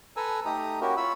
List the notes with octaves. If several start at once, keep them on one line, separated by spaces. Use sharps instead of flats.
A4 B4 G#5 A#5 E6
A3 D#4 G4 A#5 D#6
A#3 C#4 E4 F#4 G4 A#4
F4 C#5 B5 E6